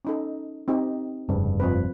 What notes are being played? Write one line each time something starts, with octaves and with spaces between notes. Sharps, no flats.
C#4 D#4 A4
C4 D#4 G4
F1 G2 C#3
F3 C4 B4